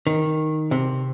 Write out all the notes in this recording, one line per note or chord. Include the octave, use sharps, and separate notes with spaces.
D#3
C3